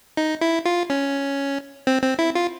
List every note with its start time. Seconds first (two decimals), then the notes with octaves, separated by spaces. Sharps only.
0.17 D#4
0.41 E4
0.66 F4
0.90 C#4
1.87 C4
2.03 C4
2.19 E4
2.35 F4